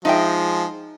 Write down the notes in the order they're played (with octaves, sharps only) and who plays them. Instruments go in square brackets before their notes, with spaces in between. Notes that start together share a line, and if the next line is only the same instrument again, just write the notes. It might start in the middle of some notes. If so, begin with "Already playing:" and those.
[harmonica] F3 G#3 [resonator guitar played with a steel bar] D#4 E5 G5